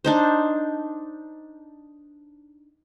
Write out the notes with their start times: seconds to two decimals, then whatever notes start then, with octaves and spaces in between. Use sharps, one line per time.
0.04 D4 D#4 C5